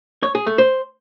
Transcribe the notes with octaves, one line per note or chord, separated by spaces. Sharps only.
C#5
G#4
A3
C5